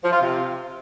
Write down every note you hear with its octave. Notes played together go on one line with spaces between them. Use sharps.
F3
F4
C3